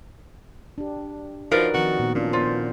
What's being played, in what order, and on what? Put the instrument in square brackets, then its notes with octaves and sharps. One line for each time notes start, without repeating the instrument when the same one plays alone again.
[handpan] D4 G4
[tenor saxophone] F3 [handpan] D#4 F#4 [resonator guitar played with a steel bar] A#4 B4 D5
[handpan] D#3 F3 C4 [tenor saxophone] F#4
[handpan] A#2 B3
[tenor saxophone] A#2 [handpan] C#4 D4 F4
[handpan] B3 C5 [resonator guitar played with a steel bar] F4